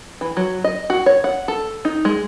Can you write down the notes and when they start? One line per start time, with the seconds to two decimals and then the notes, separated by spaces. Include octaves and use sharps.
0.21 E3
0.37 F#3
0.64 D#5
0.90 F#4
1.06 C#5
1.24 F#5
1.48 A4
1.85 D#4
2.05 G#3